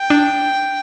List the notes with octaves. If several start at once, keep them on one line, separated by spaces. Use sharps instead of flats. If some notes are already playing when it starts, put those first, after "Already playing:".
Already playing: G5
D4